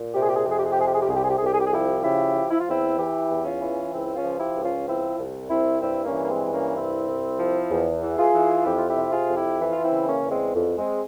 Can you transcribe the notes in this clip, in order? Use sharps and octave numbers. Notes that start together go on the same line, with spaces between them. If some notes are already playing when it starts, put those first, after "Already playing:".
Already playing: A#2
C3 G4
G#4
G4
G#4
G4
F2 G#4
G4
G#4
G4
C3 G#4
G4
G#4
G4
C2 G#4
G4
G#4
G4
G#4
C2 G4
G#4
G4
G#4
F3 E4 G4
C#3 E4 G4
F3
E4
F4
E2 C4 E4
E3 E4 G4
E2
C#4 F4
E3
C#2 C4 E4
C#4 F4
F3
E4 G4
C#2
C#4 F4
F3 C4 E4
C2
C2 C4 E4
G2 C4 E4
A#3 C#4
E3
A#3
G#3 C4
G2
A#3 C#4
C2 C4 E4
C2
F3
E2
E3
F4 G#4
E3
F2 E4 G4
F4
E4 G4
C3
F4 G#4
F2
E4 G4
E3
F4
C4 E4
C#3
A#3 C#4
E2
G#3 C4
F2
G#3 C4